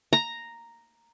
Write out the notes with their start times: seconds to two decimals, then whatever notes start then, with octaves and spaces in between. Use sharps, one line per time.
0.13 A#5